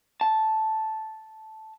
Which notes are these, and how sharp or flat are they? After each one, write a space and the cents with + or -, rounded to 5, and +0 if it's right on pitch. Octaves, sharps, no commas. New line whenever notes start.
A5 -5